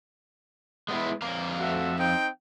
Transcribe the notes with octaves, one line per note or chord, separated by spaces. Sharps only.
G#3 B3 E4
F2 F5 A#5
A3 F#4 E5
C4 D#4 G5